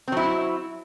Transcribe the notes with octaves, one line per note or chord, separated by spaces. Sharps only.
F#3 C4 E4